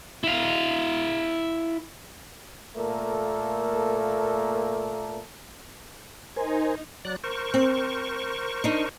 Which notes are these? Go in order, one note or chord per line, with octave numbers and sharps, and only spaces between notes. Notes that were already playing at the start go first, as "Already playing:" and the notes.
E4 F5
A#2 A3 A#3 A4 A#4
D#4 A#4 C5 D#5 G#5
F#3 D5 F#6
A#4 C5 C#6
C4
D4 D#4